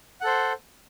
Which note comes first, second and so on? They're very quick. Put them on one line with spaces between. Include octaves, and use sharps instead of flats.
F#5 A4 C5